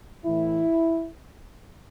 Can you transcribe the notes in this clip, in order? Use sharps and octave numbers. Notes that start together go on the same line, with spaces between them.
A2 E3 E4